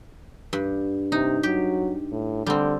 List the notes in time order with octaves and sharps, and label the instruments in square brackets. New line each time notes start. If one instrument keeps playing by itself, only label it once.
[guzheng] G2
[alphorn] C3 [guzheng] D#4
[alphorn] F#3 [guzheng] G4
[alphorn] A2
[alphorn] D3 [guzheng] G3 C4